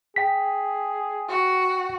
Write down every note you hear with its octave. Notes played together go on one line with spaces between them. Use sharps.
G#4 G5 B6
F#4